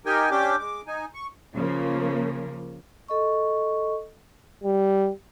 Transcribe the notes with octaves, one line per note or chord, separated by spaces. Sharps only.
D#4 G4 A#4 G5 G#5
C#4 D4 G4 G5 D6
G#3 D6
D#4 G#5
C#6
C#3 F3 A#3
A4 D#5 C#6
G3